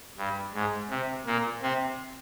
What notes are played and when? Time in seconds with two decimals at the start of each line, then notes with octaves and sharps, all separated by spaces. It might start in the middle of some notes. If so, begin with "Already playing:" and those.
0.18 G2
0.54 G#2
0.90 C3
1.26 A#2 A#3
1.62 C3 C4